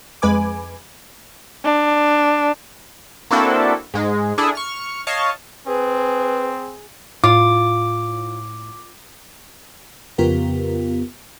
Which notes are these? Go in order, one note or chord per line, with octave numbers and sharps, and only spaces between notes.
F2 G#3 B4 G#5 D6
D4
A#3 C4 D4 E4 F#4 A4
G#2 G#3
D4 E4 G#4 A4
C#6 F6
C#5 D#5 F5 A5 C#6
C4 G#4 B4
A2 F4 D6
F2 C#3 B3 F4 G4 A#4